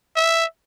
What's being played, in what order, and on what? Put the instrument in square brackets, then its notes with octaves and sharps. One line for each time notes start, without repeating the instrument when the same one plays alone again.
[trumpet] E5